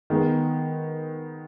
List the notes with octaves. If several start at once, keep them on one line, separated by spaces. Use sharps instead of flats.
D#3 G#3 B3